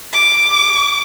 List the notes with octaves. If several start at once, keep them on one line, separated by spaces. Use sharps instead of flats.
D6